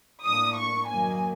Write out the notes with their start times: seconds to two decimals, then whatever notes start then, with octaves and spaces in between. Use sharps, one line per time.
0.24 A2 F3 A#3 D4 D#6
0.56 C#6
0.88 F#2 D#3 F#3 A#3 G#5